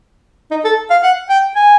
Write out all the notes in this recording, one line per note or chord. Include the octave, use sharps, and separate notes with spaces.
D#4
A4
F5
F#5
G5
G#5